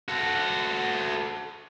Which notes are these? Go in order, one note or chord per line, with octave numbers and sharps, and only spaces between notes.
F#4 A4